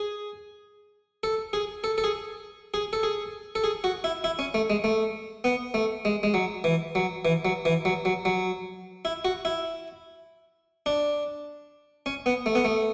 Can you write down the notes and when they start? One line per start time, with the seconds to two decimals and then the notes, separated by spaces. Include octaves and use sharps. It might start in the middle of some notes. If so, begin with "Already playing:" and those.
Already playing: G#4
1.23 A4
1.53 G#4
1.84 A4
1.98 A4
2.04 G#4
2.74 G#4
2.93 A4
3.03 G#4
3.55 A4
3.64 G#4
3.84 F#4
4.04 E4
4.24 E4
4.39 C#4
4.54 A3
4.70 G#3
4.84 A3
5.44 B3
5.74 A3
6.05 G#3
6.23 G#3
6.34 F#3
6.64 E3
6.95 F#3
7.25 E3
7.45 F#3
7.65 E3
7.85 F#3
8.05 F#3
8.25 F#3
9.05 E4
9.25 F#4
9.45 E4
10.86 D4
12.06 C#4
12.26 B3
12.46 A3
12.55 B3
12.65 A3